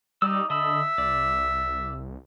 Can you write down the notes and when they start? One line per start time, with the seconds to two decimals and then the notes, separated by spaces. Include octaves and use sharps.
0.22 G3 D#4 D5 E6
0.50 D3 D#5 E5 A5 B5
0.98 C2 D5